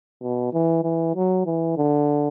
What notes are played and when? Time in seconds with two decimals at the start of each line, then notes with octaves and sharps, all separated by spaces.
0.22 B2
0.53 E3
0.83 E3
1.15 F#3
1.46 E3
1.77 D3